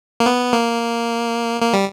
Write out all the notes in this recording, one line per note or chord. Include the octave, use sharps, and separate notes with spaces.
A#3
B3
A#3
A#3
G3